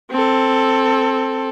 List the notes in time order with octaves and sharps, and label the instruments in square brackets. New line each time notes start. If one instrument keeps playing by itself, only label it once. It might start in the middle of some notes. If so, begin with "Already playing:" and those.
[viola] C4 A4